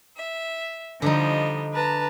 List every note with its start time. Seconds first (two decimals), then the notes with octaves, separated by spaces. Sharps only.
0.16 E5
1.02 D3 F3 G3 D4 D#4 D#5
1.73 B4 A5 A#5